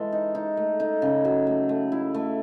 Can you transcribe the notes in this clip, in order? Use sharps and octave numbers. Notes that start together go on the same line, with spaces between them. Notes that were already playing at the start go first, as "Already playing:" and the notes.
Already playing: E3 G#3 A4
D#4
D#4
A3
D#4
C#3
F#3
A3
A3
E4
A3